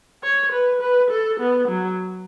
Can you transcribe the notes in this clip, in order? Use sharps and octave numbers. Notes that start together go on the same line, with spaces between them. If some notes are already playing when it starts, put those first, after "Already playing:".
C#5
B4
B4
A4
B3
F#3